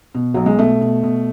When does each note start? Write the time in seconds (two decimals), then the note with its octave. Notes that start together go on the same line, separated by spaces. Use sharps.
0.15 B2
0.34 B1 F#3
0.46 G#3
0.59 B2 A3
0.81 B2
1.03 B2